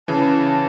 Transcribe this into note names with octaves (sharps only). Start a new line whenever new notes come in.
C#3 E3 A5